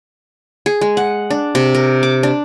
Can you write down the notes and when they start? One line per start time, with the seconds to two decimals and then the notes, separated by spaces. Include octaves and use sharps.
0.66 G#4
0.81 G#3
0.97 F#5
1.30 D4
1.55 C3
1.75 A#4
2.03 D6
2.23 D4